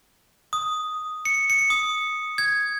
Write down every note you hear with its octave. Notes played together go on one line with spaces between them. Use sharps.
D#6
C#7
C#7
D#6
G#6